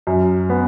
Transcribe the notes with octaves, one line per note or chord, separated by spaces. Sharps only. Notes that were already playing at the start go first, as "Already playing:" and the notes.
F#2
B3